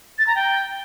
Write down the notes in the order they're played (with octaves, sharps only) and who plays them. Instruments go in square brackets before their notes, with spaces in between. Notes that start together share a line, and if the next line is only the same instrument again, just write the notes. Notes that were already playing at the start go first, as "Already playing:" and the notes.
[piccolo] A6
A#5
G5